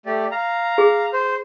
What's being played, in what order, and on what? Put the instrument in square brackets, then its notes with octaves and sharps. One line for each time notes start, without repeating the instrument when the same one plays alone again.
[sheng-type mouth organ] A3 G4 D5
F5 A#5
[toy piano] G#4
[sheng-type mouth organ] C5